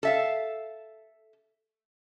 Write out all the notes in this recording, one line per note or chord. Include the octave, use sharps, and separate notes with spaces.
A4 E5 F5